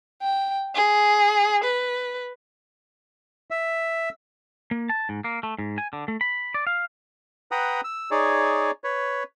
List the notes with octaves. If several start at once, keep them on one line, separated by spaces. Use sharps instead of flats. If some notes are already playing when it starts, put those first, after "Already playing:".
G5
G#4
B4
E5
A#3
A5
G#2
A#3
A3
G#2
G#5
D3
A3
B5
D5
F5
B4 F#5 G5 A#5 D#6
E6
D#4 G#4 C#5 D5
B4 C#5